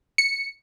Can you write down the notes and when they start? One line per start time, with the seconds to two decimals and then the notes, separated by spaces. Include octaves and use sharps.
0.18 C#7